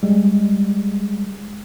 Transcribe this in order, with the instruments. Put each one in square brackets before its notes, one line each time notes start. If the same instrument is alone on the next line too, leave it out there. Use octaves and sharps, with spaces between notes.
[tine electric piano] G3 G#3